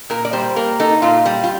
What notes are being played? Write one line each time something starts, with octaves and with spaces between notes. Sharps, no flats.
A#2 A#4
D5
G3 C5
A#3 A#4
D#4 A4
A#2 F4
G3
F4